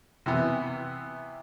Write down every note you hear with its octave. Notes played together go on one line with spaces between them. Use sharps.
C3 E3 B3